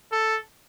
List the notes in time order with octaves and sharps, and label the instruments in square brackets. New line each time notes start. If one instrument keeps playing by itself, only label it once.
[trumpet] A4